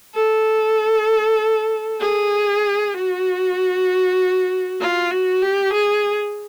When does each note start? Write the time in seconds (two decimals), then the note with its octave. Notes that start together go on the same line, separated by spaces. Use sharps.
0.15 A4
2.01 G#4
2.94 F#4
4.80 F4
5.11 F#4
5.42 G4
5.73 G#4